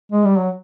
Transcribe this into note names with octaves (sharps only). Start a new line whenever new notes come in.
G#3
G3
F#3